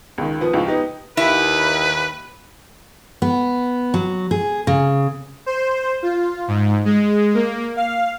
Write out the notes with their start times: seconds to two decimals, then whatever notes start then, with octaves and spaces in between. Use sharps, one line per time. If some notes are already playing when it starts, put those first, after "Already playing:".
0.18 C#2 D#3
0.41 F3 B3
0.53 C#2 A2 F3
0.67 B3 D#4 G4
1.17 D#2 E4 B4
3.22 B3
3.94 F#3
4.31 G#4
4.67 C#3
5.46 C5
6.03 F4
6.48 G#2
6.85 G#3
7.34 A#3
7.76 F5